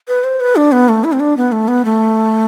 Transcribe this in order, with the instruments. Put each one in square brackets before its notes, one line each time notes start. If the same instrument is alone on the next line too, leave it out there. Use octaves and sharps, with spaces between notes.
[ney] B4
C5
B4
D4
B3
A3
E4
C4
D4
B3
A3
B3
A3